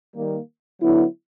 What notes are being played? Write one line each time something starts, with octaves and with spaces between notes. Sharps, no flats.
D#3 G3 A#3
D3 F#3 B3 E4